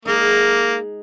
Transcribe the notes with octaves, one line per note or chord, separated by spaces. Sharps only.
G#3 A#3 D#4